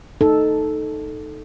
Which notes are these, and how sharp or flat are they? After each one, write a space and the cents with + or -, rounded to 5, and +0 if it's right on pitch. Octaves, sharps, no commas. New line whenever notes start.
D#4 -10 A4 -5